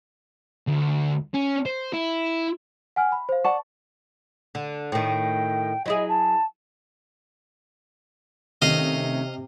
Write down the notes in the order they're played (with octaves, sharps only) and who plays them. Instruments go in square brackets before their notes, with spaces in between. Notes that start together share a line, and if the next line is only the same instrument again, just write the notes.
[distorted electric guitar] D2
C#4
C5
E4
[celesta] F#5 G#5 F6
B5
C5 F5
[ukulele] D5 F#5 A5 [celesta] C#6
[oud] D3
[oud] A2 D#3 [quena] G5
[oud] F#3 E4 G#4 [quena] D#5
[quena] A5
[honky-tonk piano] C3 [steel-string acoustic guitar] D#3 A3 C#4 [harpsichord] D#5 F5